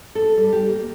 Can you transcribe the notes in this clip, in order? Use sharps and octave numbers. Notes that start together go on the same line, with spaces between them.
A4
G3
G4
A#3